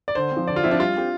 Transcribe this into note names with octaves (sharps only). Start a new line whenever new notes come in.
D5
D3 C5
F3 C4
D3 D5
F4
F3 C4 E4
D4
G3 F4
C4 G4